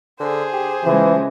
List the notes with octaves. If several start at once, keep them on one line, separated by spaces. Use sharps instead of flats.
D3 G#4 C5
G4
C#3 E3 F3 G#3